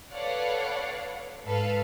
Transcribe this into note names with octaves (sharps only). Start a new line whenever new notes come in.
A4 B4 C#5 D5 F5 F#5
G#2 A4 B4 F5